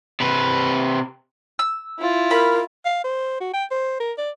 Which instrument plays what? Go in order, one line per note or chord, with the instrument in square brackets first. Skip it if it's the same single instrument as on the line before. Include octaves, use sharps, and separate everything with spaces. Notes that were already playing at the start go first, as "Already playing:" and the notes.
[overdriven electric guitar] C3 B4
[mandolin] E6
[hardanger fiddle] E4 F4
[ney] A#4 [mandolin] B5
[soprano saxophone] F5
C5
F#4
G5
C5
A#4
D5